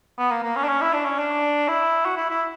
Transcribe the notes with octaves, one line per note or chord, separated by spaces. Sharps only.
B3
A#3
A#3
C#4
D4
C#4
E4
D4
C#4
D4
E4
F#4
E4
E4